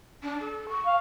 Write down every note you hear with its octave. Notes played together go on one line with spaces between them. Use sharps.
D4
A4
C#6
F5